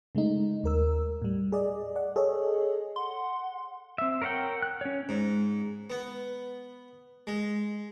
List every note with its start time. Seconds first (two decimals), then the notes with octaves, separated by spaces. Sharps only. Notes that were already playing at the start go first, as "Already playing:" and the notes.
0.15 C#3 G#3 A3 D#4
0.64 D#2 A#4 E6
1.22 A2 G3
1.52 G#4 D5 D#5
1.96 D5 F#5
2.16 G#4 A4 C#5 D#5
2.96 F#5 C6
3.98 C4 E5
4.22 A#4 C#5 E5 F#5 G5
4.62 F#6
4.81 C#4 C#5
5.09 G#2
5.90 B3
7.27 G#3